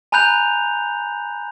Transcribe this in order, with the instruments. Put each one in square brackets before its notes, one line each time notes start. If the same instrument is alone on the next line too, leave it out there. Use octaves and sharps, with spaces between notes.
[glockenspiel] G#5 A#5 B5 F#6 G6 F7